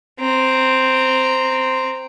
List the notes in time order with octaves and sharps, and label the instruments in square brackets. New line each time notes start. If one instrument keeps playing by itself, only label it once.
[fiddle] C4 A#5